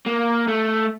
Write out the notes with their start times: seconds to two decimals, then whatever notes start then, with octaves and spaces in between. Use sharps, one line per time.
0.06 A#3
0.48 A3